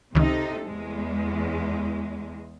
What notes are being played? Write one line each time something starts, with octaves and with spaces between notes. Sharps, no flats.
C#2 C3 D#3 D#4 A4
E2 G#3